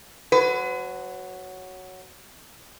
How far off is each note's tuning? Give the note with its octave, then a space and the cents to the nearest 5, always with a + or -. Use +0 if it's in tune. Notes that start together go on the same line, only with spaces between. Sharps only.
F#3 +0 B4 +45